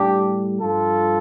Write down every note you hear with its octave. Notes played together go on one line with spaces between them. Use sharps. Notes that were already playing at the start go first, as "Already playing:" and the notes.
Already playing: A2 G3 D4 G4
G2 F3 F4 A4